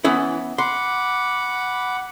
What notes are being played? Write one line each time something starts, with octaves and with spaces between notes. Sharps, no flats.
E3 B3 C#4 E4
F#5 B5 C6 D6